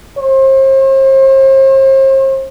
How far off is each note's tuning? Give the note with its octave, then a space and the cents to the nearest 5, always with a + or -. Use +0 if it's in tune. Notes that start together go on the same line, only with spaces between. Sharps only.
C5 +40